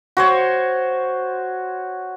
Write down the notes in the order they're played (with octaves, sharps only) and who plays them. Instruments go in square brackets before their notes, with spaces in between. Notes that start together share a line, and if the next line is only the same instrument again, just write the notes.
[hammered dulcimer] F#4 C5 C#5